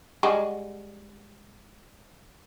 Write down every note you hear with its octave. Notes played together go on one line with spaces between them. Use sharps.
G3 G#3 F#4